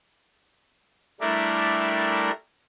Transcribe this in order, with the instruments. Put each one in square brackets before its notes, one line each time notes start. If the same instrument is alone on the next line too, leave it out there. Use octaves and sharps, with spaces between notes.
[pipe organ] G3 A3 D4 E4 A#4